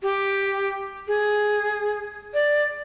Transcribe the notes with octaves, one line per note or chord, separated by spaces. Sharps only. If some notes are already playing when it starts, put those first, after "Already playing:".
G4
G#4
D5